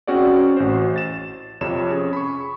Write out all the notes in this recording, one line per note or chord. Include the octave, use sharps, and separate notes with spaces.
C4 C#4 F#4 G#4 D5
A1 F#4 C5
A6 E7
F2 C3 C#5 E7
C#4 G#4
B5 C#6